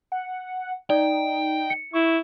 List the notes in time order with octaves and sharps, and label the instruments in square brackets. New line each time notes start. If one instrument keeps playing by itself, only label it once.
[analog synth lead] F#5
[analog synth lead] D#4 [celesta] D5 [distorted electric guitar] G5
[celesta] C#7
[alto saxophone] E4 [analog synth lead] C#6